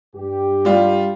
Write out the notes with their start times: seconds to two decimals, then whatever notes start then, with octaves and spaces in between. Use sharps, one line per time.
0.15 G2 G4
0.65 G3 F4